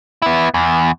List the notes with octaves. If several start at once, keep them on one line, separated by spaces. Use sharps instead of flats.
B3 E4
E2